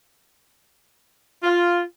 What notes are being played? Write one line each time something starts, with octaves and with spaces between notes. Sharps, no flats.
F4